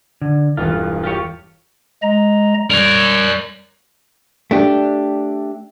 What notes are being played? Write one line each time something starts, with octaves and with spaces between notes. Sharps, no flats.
D3
E1 E2 G2 F4
F4 G4 C#5
G#3 D#5 A#5
G3 A#4 C#5
A3 D4 G4